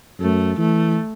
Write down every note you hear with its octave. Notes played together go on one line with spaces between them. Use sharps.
F#2 A3
E3 A3